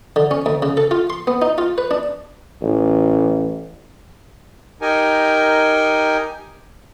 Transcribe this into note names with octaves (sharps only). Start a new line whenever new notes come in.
D3
C#4
D2
C#3
A4
F4
C6
B3
D#4
F4
B4
D4
A1
D#4 G4 A#4 G#5